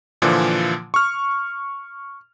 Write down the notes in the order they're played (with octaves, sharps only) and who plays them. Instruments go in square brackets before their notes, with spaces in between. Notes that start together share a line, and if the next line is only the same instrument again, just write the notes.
[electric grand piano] A#2 D3 E3 F3
C#6 F6